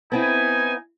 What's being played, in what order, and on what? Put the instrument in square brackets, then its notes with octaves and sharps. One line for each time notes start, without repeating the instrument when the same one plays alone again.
[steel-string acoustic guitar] B3 C4 E4 [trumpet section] D#4 G#5